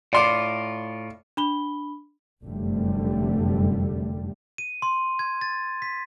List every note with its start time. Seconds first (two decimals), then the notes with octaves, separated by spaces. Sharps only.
0.13 A2 F4 D5 C6 D6
1.37 D4 B5 G7
2.42 F1 F#2 D3 G3 A3
4.58 D#7
4.82 C6
5.19 G#6
5.41 A6
5.82 B6